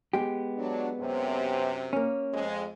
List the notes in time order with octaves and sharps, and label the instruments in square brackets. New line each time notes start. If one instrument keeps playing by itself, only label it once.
[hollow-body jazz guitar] G#3 B3 G4
[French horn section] F#3 D4
F#2 C3
[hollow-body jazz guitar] A#3 C#4
[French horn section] F2 G#3